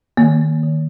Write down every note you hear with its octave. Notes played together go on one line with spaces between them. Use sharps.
D#3 A#3
D#3